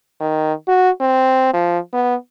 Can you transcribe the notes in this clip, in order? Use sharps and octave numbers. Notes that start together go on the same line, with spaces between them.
D#3
F#4
C4
F3
B3